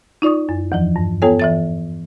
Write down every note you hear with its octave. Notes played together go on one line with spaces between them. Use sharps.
D#4 F4 D5 C#6 D#6
F#2
E2 E3 F3
G2
B3 F4 A4 C#5 G5 G#5
E3 E5 A6